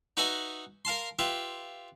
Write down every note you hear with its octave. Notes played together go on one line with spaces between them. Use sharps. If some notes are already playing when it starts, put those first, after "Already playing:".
D#4 F#4 B4 D#5 E5 G#5
A#4 F5 A5 C6
F4 G4 B4 E5